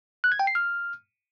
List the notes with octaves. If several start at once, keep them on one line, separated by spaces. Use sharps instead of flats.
F#6
G#6
G5
C7
F6